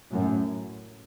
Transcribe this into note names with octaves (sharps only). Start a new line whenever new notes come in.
F#2 A2